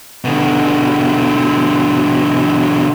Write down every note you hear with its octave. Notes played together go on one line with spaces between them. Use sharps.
B2 D3